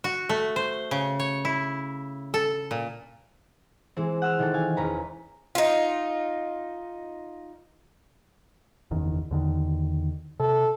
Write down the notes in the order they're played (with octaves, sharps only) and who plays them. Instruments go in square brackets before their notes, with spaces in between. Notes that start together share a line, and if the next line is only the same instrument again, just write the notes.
[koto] F#4
A3
C5
C#3
C#5
E4
A4
A#2
[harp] E3 G#3 C4
F#5 E6 F6
D#3 E3 A4
F5 G#5
E1 C#4 B4 A#5
[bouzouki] D#4 F4
[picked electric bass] F#1 E2 D#3
E2 D3 D#3
[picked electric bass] C3 [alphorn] A4